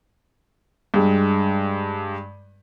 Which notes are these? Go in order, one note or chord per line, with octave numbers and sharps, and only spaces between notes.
G2 G#3